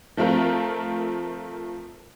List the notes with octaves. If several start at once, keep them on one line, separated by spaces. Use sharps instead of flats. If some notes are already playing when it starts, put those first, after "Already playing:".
F3 A3 C4 F4 A#4